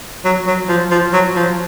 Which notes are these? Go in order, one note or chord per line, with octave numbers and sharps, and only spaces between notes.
F#3
F#3
F3
F3
F#3
F3